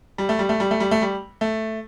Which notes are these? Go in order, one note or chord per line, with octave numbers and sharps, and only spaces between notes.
G3
A3
G3
A3
G3
A3
G3
A3
G3
A3